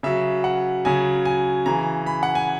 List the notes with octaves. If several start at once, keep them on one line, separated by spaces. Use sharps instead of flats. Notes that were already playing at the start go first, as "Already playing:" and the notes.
C#3 F#3 E5
F#5
C#3 F#3 G#5
G#5
C#3 E3 A#5
B5
F#5
G#5